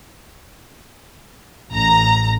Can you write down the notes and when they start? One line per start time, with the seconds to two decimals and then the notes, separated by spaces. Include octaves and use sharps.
1.70 A1 A#5